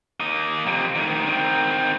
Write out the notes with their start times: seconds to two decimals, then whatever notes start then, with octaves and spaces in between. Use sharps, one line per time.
0.20 A#3 D#5
0.66 F2 C3
0.95 D2 D#3
1.26 D#3 C4